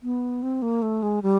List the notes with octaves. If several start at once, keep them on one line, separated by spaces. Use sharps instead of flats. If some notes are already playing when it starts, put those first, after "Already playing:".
B3
C4
A#3
A3
G#3
G3